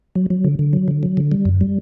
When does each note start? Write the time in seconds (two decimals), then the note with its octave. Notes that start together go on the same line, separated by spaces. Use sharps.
0.15 F#3
0.30 F#3
0.44 D3
0.59 D3
0.73 F#3
0.88 D3
1.03 F#3
1.17 D3
1.32 G3
1.45 F#2
1.61 G3